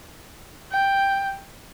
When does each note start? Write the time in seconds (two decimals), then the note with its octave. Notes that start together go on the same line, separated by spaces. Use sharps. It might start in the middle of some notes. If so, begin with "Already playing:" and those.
0.71 G5